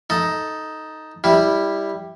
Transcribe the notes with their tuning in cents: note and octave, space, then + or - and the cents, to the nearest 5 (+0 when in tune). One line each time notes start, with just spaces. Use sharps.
D#4 +5 A4 +0
G3 +10 E4 -10